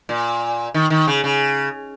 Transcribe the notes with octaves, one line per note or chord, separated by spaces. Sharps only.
A#2
D#3
D#3
C#3
C#3